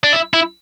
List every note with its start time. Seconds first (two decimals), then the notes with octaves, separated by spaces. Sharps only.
0.04 D4
0.13 E4
0.34 E4